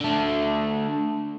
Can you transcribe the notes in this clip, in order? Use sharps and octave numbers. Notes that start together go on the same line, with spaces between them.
D3 A3